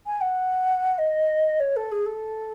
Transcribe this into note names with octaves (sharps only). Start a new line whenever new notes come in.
G#5
F#5
D#5
C#5
A4
G#4
A4